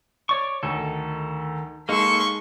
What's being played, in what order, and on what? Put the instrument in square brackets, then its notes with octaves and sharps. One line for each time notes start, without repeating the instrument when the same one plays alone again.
[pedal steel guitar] C#5 D5 C#6
[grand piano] D2 [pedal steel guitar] D#3 A4
[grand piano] G#3 D#4 [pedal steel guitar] A#3 A4 [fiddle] C6 C#6